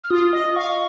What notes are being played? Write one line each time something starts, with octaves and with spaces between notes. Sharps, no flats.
F6
F4 D#6
D#5
F5 C#6